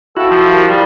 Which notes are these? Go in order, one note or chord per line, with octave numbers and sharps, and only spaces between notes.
E4 F#4 A4 C5 F5 G5
F3
G4 A#4 F5
G3